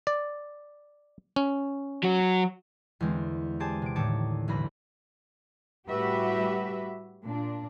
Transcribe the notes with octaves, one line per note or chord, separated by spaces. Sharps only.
D5
C#4
F#3 F#4
E2 D3 G#3 C4
G4 G#4 C5 D5 G#5 A5
C3 D7
D#2 A2 D3 C#5 A5 D6
B1 E2 D3 B5 A#6
A2 G3 F#4 G4 B4 E5
A#2 D4